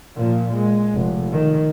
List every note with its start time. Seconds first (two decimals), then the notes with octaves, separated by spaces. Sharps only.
0.16 A#2 F3
0.53 G#3
0.94 F1
1.32 D#3